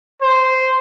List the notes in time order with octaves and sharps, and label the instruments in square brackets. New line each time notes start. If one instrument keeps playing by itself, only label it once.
[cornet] C5